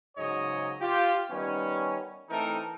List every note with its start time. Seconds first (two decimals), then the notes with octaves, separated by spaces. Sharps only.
0.17 G#2 C#3 F#3 C#5 D#5
0.81 F4 G4
1.31 D#3 G3 B3 C#4
2.29 E3 A3 C4 D#4 A4 A#4